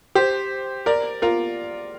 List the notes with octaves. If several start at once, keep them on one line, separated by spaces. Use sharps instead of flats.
G4 C5
A#4 D5
F4 A#4